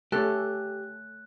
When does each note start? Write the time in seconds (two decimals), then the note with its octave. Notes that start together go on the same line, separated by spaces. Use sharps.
0.12 A3 C#4 G4 A4 F#6